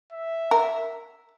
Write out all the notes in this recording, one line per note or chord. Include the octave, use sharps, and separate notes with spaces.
E5
A#4